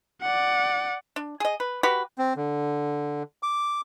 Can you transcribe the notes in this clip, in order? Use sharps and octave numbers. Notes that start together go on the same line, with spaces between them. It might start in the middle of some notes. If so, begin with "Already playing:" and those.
D5 F#5
D4
G#4 D#5
B4
F#4 G4 B4
C4
D3
D6